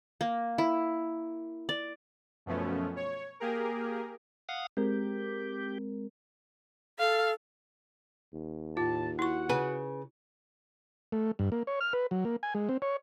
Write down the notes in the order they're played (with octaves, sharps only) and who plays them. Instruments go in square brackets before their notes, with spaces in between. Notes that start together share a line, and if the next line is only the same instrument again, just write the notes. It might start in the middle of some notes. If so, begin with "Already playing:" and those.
[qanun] A#3
E4
D5
[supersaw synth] F#2 B2 F3 A3 B3 C#4
C#5
A#3 G4 G#4 A#4
[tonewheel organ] F5 F#5 D#6
[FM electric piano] G#3 C4 A#4 [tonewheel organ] G4
[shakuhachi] A4 [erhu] F5
[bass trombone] D#2
[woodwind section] A2 A5 [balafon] F4
[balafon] E4 C#6 [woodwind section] F#4 F#5
[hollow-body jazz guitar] C#3 B4 G#5
[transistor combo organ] A3
G2
A#3
C#5
F6
B4
F#3
A#3
G#5
G#3
C4
C#5